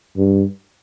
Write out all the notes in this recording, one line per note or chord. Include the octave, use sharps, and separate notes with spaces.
G2